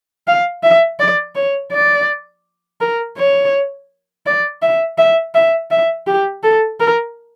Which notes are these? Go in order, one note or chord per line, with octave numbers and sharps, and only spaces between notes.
F5
E5
D5
C#5
D5
A#4
C#5
D5
E5
E5
E5
E5
G4
A4
A#4